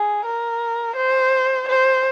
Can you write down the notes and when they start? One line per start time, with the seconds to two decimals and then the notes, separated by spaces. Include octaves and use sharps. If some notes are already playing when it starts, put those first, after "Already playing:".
Already playing: G#4
0.25 A#4
0.97 C5
1.69 C5